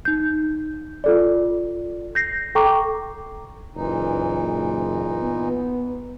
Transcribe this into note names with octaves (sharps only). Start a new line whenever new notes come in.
D#4 G6
F4 A4 D5
G6 A#6 C7
A4 G5 A#5 C#6 D6
F#1 A#2 E3 D#4
B3